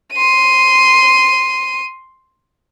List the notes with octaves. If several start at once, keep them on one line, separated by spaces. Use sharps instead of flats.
C6 D#7